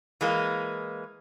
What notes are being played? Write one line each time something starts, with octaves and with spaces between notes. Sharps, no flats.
E3 G#3 A#3